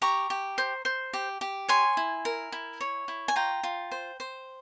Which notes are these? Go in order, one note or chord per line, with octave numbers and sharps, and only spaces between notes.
G4 A#5 C#6
G4
C5
C5
G4
G4
C#5 G#5 C6
E4
A#4
E4
C#5
E4
G#5
F4 G5 A#5
F4
C5
C5